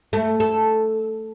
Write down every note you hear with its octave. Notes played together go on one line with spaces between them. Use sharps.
A3
A4